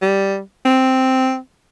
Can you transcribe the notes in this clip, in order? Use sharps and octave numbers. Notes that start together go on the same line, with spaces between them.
G3
C4